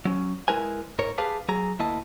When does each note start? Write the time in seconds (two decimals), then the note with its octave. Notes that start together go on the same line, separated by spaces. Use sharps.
0.05 F#3 C#4
0.48 G#3 E4 A#4 B4 G#5
0.99 G#2 A#4 C#5
1.18 G4 G#4 B4 F5 A5
1.48 F#3 G#4 A#5
1.79 D2 A#3 E4 D#5 A5